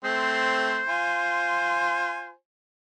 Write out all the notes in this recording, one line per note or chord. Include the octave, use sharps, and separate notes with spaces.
A3 C4 C5
F4 G#5